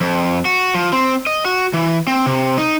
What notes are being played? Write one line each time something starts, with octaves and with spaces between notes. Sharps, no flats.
F2
F#4
F3
C4
D#5
F#4
E3
C4
C3
D#4